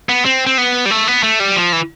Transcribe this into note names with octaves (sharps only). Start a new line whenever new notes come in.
B3
C4
C4
B3
G3
A3
B3
A3
G3
F3
E3